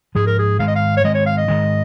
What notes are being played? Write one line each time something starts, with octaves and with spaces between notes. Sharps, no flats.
G#2 F3 G#3 G#4
A#4
G#4
G#2 D#3 G#3 F5
D#5
F5
C#5
G#2 D#3 G#3 D#5
C#5
F5
D#5
G#2 D#3 G#3